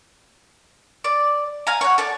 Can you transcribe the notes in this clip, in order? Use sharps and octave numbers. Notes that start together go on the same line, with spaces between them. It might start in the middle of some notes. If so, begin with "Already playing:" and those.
D5
F5 G#5 A#5
C#5 F#5
A4 D5